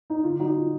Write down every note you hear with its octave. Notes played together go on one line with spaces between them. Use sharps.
D#4
D3 F4
F#3 D#4 F#4
F4